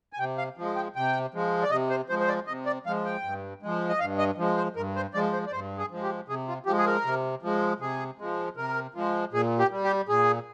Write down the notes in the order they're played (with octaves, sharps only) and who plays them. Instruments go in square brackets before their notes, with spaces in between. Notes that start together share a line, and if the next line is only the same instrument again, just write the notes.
[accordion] G#5
C3 G5
F5
F3 G#3
G5
C3 G5
F3 G#3
D5
C3 D#5
C5
F3 G#3 C5
C5
D5
C3 D#5
D5
F3 G#3 F5
G5
G2
F3 G#3
D#5
G2 F5
D#5
F3 G#3
C5
G2 A#4
C5
F3 G#3 D5
C5
D5
G2 C5
G#4
F3 G#3
G4
C3 G#4
F4
F3 G4
G#3
G#4
A#4
C3
F3 G#3
C3 G#4
F3 G#3
C3 A#4
F3 G#3
A#2 G#4
G4
G3
G4
A#2 G#4